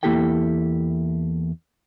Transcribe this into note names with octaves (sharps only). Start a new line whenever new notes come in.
E2 A#3 E4 G4 A4 G5